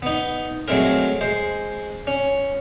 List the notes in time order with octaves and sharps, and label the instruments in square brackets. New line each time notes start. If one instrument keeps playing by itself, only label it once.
[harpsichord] B3 D#4
F#3 G#3 A3 C4 A#4
G#3 C5
C#4